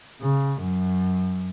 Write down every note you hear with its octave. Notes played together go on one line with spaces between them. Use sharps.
C#3
F#2